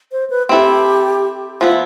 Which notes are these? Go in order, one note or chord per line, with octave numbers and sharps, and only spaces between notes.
C5
B4
C4 E4 G4 A4
F3 B3 E4 F4